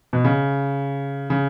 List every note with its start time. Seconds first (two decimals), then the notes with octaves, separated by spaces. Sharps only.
0.13 B2
0.24 C#3
1.30 C#3